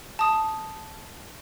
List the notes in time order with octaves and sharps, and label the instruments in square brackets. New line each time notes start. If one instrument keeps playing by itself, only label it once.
[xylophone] A5 D#6